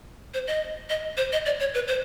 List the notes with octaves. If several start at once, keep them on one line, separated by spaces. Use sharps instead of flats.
C5
D#5
D#5
C5
D#5
D5
C#5
B4
C5